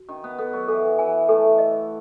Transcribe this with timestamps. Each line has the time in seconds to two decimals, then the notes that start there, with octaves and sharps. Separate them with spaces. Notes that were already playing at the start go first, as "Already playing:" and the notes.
Already playing: F#4
0.09 D#3 C#4
0.24 B3
0.38 B3 A4
0.53 F#3
0.68 E3 A4
0.99 E3 G#5
1.29 A3 A4
1.58 D#5